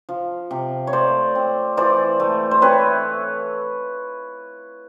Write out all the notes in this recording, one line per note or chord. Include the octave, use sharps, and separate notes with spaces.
F3
C3
C#5
A3 C5 D5
C4
E3 C5 D5
A3
C5
C4 B4 C#5